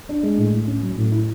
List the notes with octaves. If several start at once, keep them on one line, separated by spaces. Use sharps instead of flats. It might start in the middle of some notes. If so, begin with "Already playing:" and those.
D4
G#3
A2
A2
C#4
F#3
A2
E4